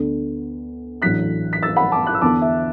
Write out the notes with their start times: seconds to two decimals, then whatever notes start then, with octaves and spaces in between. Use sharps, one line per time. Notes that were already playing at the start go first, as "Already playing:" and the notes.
Already playing: D2 D3 B3
1.02 A1 A2 F#3 D4 F#6 B6
1.53 B6
1.63 E6 A6
1.76 F#5 B5
1.92 A5 D6
2.07 D6 F#6
2.14 E6
2.21 E2 D3 B3 D4 A5 D6
2.42 E5